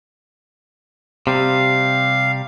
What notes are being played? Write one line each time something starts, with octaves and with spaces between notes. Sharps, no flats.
C3 G3 F5